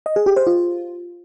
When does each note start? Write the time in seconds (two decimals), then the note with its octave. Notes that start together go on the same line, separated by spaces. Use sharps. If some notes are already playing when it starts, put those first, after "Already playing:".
0.06 D#5
0.16 G#4
0.26 G4
0.36 C5
0.47 F4